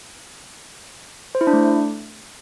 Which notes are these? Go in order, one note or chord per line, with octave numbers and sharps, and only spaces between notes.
C5
E4
D4
A3